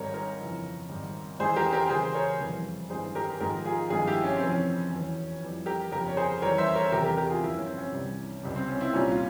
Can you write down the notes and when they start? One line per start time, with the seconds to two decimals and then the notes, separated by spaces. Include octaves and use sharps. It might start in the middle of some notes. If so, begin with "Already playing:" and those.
Already playing: G#1 G#2 G3 A#4 C#5
0.14 A#4 C#5
0.39 G1 F2 C#3 E3
0.89 G#1 G#2 G3
1.39 E2 E3 G#3 G#4 C5
1.56 G4 A#4
1.73 G4 A#4
1.90 E1 E2 C#3 G#4 C5
2.14 A#4 C#5
2.41 F1 E2 E3 G3
2.90 G#1 G2 E3 G#3 G#4 C5
3.15 G4 A#4
3.40 G#1 G#2 F3 G#3 G4 A#4
3.65 F4 G#4
3.90 G#1 G2 F3 G#3 F4 G#4
4.07 E4 G4
4.24 C#4
4.36 F1 F2 E3 C4
4.50 C#4
4.92 E1 E2 E3
5.41 F2 E3 G3
5.66 G4 A#4
5.92 G1 F2 C#3 G4 A#4
6.08 C#5
6.17 G#4 C5
6.42 E2 E3 G3 A#4 C#5
6.58 C5 E5
6.75 A#4 C#5
6.92 E1 E2 C3 G4 A#4
7.04 G4 A#4
7.17 G4 A#4
7.30 F4 G#4
7.42 G1 G2 F3 E4
7.55 C#4
7.66 C4
7.78 C#4
7.93 C2 C3 E3 G3
8.43 C#2 C3 G3
8.56 C4
8.68 C#4
8.81 C4 E4
8.93 C2 A#2 G3 C#4 F4
9.12 F4